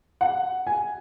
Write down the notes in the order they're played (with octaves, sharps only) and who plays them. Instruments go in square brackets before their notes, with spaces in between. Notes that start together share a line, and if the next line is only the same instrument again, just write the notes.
[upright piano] F#5
G#5